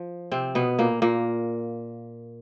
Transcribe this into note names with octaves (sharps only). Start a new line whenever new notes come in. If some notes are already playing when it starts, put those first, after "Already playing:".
Already playing: F3
C3 C4
B2 B3
A#2 A#3
A#2 A#3